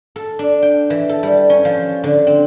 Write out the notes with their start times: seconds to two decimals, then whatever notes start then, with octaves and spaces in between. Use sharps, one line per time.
0.16 A4
0.39 D4
0.62 G5
0.90 E3
1.09 A4
1.23 G3
1.50 C#4
1.65 F3
2.04 D3
2.27 C4